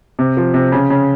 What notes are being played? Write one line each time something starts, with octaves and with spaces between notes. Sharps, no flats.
C3
F3
C3
C#3
C#3